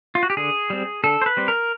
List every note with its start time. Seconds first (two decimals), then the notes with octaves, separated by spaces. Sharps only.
0.15 F4
0.23 F#4
0.30 G4
0.37 D3 G#4
0.70 G3 C4
1.04 D3 A4
1.22 C5
1.26 B4
1.37 G3 C4
1.48 A#4